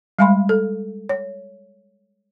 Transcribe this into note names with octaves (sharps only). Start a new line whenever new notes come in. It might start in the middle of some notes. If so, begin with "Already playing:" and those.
G3 G#3 F5 G#5 B5 C6
A4
C#5